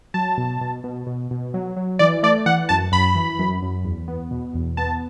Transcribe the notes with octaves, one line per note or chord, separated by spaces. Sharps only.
F#3 A5
B2
B2
B2
B2
B2
F#3
F#3
E3 D5
A3 D5
E3 F#5
F#2 A5
F#2 B5
E3
F#2
F#2
E2
B3
B2
E2
B3 A5